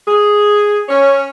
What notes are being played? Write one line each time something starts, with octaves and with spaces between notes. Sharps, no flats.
G#4
C#4 C#5